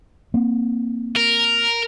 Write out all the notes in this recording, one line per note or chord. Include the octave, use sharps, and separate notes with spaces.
A#3 C4
A#4